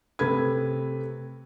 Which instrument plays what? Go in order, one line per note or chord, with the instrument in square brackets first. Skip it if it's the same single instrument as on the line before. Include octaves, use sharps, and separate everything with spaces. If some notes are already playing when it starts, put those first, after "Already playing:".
[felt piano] C3 A3 B4 G#6